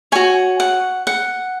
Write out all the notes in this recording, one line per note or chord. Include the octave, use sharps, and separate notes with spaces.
F#4 C#5 G#5
F#5
F#5